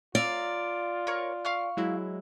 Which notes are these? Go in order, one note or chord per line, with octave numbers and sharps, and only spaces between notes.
F4 A#4 D5 F5 E6
A#4 C#5
F5 C#6 F6
F#3 G#3 E4